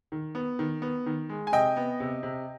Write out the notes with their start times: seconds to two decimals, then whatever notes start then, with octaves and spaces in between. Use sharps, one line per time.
0.12 D#3
0.35 B3
0.59 D#3
0.82 B3
1.06 D#3
1.29 G#3
1.47 G#5
1.52 C3 D#5 G5
1.77 B3
2.00 C3
2.23 C3